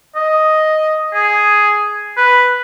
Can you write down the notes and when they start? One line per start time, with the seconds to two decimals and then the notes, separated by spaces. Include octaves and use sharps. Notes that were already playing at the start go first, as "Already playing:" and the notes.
0.16 D#5
1.14 G#4
2.17 B4